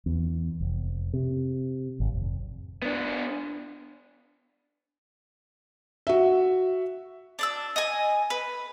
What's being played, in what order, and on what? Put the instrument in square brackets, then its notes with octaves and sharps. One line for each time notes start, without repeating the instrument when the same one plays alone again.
[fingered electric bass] E2
F1
C3
G#1
F1
[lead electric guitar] B3 D4
[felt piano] F#4 E5
[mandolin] D4 D5 E6
D#5 G#5
B4